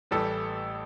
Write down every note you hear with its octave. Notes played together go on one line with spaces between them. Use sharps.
A1 A2 E3 G3 A4